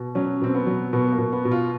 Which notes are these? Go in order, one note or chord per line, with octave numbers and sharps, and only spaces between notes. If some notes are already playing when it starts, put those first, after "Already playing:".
Already playing: B2
F#3 C#4
B2 C4
B3
F#3
B2 B3
A#3
B2
B3
B2
F4